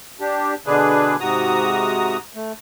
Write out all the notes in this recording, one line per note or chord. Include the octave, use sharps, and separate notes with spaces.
D4 G4
B2 D3 D4 G#4 B4
G#2 C3 F#4 A#5 D#6
A3